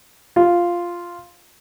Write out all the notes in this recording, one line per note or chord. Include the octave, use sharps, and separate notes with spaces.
F4